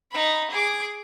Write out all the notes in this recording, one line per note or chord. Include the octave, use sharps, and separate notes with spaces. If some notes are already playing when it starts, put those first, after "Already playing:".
D#4 B5
G#4 D6